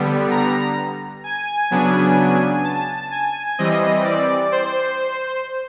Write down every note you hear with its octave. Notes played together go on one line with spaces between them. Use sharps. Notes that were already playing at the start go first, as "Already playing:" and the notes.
Already playing: D3 G3 B3
A#5
G#5
C#3 F#3 B3 D4 G#5
A5
G#5
E3 G3 C4 D#5
D5
C5